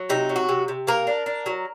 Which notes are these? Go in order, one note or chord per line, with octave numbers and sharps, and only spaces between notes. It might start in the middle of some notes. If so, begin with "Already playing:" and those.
Already playing: F#3
C3 D#4
F#3
F#4
C3
C3
A#3 A#4
D4
D4
F#3